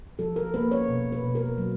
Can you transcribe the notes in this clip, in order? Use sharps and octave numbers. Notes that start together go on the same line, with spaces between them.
F3 A4
A#4
A#3 B4
C#5
B2
B4
B2
A#4
F#3